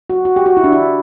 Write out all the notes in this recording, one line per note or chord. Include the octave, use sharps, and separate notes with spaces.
F#4
F#4
G4
F#4
E4
D4
E4